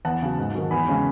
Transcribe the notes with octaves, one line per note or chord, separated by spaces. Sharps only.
E2 F#5 A5
C#3 F#3
G#2
D#3 F#3
E2 G#5 B5
C#3 G#3 C#4